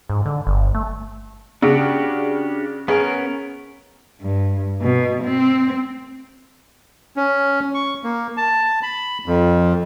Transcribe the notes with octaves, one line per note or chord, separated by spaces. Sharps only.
G#2
D3
G1
A3
C#3 D4 F#4 G4
B3 C#4 G#4 A#4
G2
B2
C4
C#4
C#6
A#3
A5
B5
F2